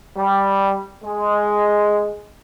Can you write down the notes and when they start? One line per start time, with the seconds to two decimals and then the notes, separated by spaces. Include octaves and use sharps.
0.16 G3
1.03 G#3